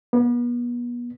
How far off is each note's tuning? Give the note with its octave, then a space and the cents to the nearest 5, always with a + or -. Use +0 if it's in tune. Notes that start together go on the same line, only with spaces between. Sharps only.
B3 -35